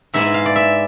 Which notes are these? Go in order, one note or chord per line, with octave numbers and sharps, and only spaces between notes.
G#2 G#3 B3 E4 E5
F5
D5
E5